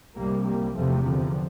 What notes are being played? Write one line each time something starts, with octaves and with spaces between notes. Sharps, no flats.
C2 C3 G3 A#3
G3 A#3
E2 C3 F3 A3
D3 F3